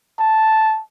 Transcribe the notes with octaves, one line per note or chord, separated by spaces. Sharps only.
A5